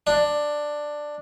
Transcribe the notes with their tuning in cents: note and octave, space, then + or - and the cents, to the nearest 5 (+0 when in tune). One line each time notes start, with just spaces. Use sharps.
D4 +10